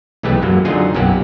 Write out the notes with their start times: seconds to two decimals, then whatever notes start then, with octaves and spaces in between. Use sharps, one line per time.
0.23 B1 E3 G#3 A3 G4 B4
0.42 F#2 F#3 A#3
0.65 D3 F#3 D#4 F4 G#4
0.94 B1 F#2 F#3 A#3 G4 F#5